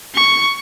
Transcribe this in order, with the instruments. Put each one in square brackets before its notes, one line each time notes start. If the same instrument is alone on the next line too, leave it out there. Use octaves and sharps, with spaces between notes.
[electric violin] C#6